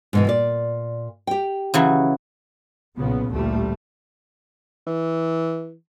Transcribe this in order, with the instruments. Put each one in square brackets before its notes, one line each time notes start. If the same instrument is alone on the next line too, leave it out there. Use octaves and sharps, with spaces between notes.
[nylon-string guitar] G#2 B2 E3
A#2 D5
G4 G5
[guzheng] C#3 E3 F#3
[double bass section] B1 A#2 C#3 B3
A1 D2 A#2 G3 A3
[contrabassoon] E3